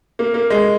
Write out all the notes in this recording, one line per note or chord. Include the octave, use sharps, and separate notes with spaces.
A#3
A#3
G#3